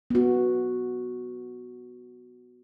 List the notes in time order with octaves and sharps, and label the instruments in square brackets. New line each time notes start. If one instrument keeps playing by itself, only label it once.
[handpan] B3 F#4